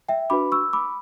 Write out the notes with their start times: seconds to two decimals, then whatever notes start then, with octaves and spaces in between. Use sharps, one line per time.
0.09 E5 G5
0.30 D4 F#4 B4 B5 D6
0.52 C#6 E6
0.73 B5 D6